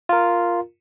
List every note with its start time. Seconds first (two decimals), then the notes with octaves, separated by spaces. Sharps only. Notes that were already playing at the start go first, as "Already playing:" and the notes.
0.09 F4 A#4